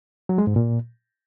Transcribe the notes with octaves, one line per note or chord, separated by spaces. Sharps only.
F#3
G#3
G#2
A#2